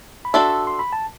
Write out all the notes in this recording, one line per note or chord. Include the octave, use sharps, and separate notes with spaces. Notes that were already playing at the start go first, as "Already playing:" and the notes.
B5
D4 F#4 A4 E5 A5 C6
C6
B5
A5